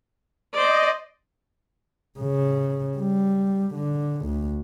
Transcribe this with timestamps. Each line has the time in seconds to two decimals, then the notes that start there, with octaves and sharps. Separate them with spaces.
0.53 C5 D5 D#5
2.19 C#3
2.98 G3
3.74 D3
4.26 D2